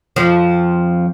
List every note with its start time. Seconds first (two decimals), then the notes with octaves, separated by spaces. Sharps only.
0.16 F2 F3